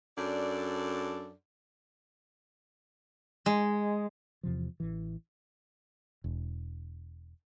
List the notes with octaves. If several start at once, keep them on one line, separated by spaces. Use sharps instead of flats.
F#2 D4 A4 D5
G#3
E2 C3 F3
A1 E3
E1